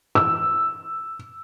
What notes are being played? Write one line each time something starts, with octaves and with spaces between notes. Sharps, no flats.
E6